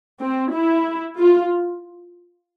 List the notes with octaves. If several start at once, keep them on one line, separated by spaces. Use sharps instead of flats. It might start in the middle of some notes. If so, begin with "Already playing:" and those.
C4
E4
F4